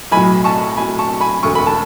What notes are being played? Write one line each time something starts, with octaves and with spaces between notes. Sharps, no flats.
B1 A2 F#3 G#5 B5
A5 C#6
B1 A2 F#3 G#5 B5
A5 C#6
G#5 B5
E1 D2 D3 C#6
B5
A5